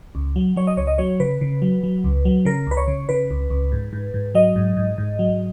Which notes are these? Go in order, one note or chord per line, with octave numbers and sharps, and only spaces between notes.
C#2
F#3
F#3 C#5
D#5
C#2 C#5
D#5
F#3 C#5
C#3 B4
C#3
F#3
F#3
C#2
F#3
C#3 A#4
C#2 B4
C#5
C#3
C#3 B4
C#2
C#2
G#2
G#2
G#2
F#3 D#5
G#2
G#2
G#2
F#3